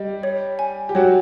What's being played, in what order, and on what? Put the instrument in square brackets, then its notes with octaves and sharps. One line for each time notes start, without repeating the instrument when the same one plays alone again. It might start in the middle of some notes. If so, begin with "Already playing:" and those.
Already playing: [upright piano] G3 G4 [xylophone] D#5
[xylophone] C#5
G#5
[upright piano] G4
[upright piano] F#3 F#4 [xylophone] C#5